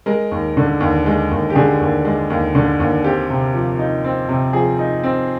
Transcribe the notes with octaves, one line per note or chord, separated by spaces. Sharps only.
G#3 A#4
D#2
D3
D#2
G#3
D#2
G4
D3 G#4
D#2
G#3
D#2
D3
D#2
C4 G4
C3
F3
D#4
C4
C3
F3 G#4
D#4
C4